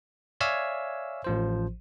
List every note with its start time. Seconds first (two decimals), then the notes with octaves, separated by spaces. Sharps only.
0.41 C#5 D5 E5 F5 G#5 E6
1.24 A1 F3 C5